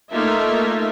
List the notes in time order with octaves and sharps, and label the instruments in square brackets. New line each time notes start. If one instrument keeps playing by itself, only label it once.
[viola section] A3 A#3 D#4 F4 E5